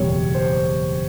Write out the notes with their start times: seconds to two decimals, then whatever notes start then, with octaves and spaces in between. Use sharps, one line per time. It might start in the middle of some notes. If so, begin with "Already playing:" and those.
Already playing: F#1 E2 B2 G3 C#5
0.35 C5